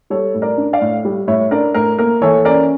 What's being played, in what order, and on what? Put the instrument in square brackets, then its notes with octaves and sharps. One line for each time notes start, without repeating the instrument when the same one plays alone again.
[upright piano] G3 A4 C#5
A2
A#4 D5
D4
D5 F5
A2
G3
A2 C#5 E5
D4 A#4 D5
A2 A#4
A#3 A#4
E3 A4 C#5
C#4 A#4 D5